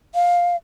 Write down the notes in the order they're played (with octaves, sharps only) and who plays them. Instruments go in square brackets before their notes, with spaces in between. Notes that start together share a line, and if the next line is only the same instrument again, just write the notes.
[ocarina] F5